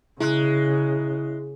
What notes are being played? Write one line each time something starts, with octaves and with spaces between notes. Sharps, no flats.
C#3 G#3 E4 F#6